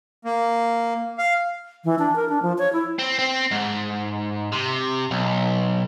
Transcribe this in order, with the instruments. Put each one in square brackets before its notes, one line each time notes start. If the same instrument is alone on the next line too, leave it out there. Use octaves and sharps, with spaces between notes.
[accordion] A#3
F5
[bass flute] E3
D4
A#4
D4
F3
C#5
E4
[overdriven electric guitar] C4
C4
G#2
C3
B1